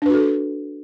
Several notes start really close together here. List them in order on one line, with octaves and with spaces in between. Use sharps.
D4 B4 F#4 A4